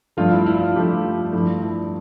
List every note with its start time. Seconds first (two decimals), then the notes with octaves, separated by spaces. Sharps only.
0.17 G2 F3 A3 F4
0.32 E4
0.46 E4
0.60 F4
0.75 G2 F3 A3 G4
1.05 F4
1.33 G2 F3 A3 E4
1.62 E4